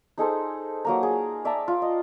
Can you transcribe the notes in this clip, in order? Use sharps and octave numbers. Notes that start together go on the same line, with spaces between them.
D#4 G#4 A4 C5
F#3 A#3 A#5
G#4
D5 E5 A5 A#5
F4
D#5